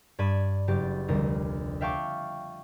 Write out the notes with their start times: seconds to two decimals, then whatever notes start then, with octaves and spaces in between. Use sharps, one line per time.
0.19 G2 D5 B5 G#6 D#7 E7
0.67 F#1 G4 A6
1.08 F1 D2 G3 A#4
1.81 E5 F5 G5 A5 C#6 D6